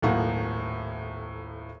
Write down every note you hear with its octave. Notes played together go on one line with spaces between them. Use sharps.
D#1 B1 A2 A#3 F4 F#5